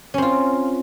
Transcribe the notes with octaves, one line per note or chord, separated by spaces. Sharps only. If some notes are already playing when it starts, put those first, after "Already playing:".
C4 C#4 F4